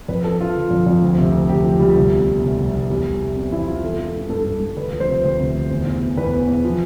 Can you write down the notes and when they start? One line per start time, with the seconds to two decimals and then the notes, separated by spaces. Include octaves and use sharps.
0.08 F2 B4
0.24 F3 A4
0.40 F3 F4
0.55 D3
0.71 F2
0.86 F2
1.02 D2
1.18 C3
1.34 D2
1.49 D2 G4
1.64 F3
1.80 D2 G3
1.97 C2
2.12 B2
2.27 B2
2.42 C2
2.58 C2
2.73 C2
2.90 E2 G3
3.05 B2
3.21 B2
3.36 B2 C4
3.52 E2 E4
3.67 B2 F4
3.84 E3 A4
3.99 E3
4.06 A4
4.15 G2
4.29 G2 A4
4.46 G2
4.61 G2
4.76 D2 B4
4.93 F3
5.00 C5
5.07 C3
5.24 D2
5.39 C3
5.55 D2
5.71 E2
5.86 E2
6.01 B2
6.17 E2 B4
6.33 B2
6.48 E2
6.65 F3